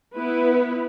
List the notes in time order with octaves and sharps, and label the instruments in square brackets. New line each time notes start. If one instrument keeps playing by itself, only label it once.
[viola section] B3 E4 B4